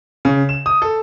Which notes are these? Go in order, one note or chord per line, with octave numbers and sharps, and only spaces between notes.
C#3
E7
D#6
A4